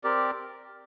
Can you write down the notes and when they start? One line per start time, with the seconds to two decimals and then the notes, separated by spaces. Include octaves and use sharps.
0.03 C4 G4 A#4 D5